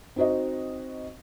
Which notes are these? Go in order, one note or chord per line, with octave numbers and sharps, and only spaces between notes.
C4 D#4 F#4 C5 D#5